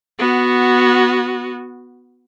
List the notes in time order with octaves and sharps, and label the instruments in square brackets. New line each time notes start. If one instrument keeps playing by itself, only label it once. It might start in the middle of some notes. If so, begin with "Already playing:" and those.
[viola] B3 F#4